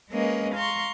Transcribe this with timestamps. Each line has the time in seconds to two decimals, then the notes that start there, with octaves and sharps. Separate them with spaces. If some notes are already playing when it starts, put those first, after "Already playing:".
0.11 G#3 A#3 C#4 B4 D#5
0.55 F5 A#5 C6 C#6